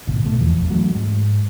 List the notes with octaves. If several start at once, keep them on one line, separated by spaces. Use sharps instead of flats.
A1 G#2 B2 D3
B2 A3
E2 E3 F3
G#1 D#2
E3 F#3 A3 C#4
G#2 G#3